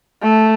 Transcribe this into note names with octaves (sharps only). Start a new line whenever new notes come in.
A3